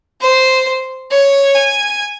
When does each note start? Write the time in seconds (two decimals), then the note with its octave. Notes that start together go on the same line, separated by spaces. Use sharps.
0.21 C5
1.11 C#5
1.55 G#5